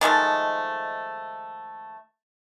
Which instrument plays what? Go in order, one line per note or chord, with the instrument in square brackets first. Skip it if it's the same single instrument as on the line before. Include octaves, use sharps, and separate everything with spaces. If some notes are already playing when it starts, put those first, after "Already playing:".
[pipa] D#3 F3 G#3 A3